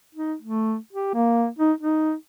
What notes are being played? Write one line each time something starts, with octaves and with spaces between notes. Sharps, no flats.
D#4
A3
G4
A#3
D#4
D#4